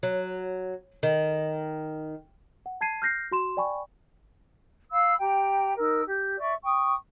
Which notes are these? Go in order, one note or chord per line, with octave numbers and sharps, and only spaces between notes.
F#3
D#3
F#5
A5 G#6 C7 D#7
F6 G6 A#6 C7
F#4 C6 E7
D5 G5 G#5 B5 C#6
F5 B5 E6
G4 G5 A#5
D#4 A#4 E6
G4 G6
D5 E5 C#6
G5 C#6 D#6